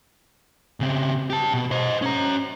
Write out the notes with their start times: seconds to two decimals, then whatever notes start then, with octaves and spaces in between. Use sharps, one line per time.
0.80 C#3 C4
1.30 G4 A5
1.54 B2
1.71 C5 D#5
2.02 C#4 A#5